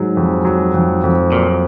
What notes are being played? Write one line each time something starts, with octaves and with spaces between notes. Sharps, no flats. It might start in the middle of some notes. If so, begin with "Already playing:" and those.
Already playing: G#2 F#3
F2
F#3
F2
F2
A#2 F#3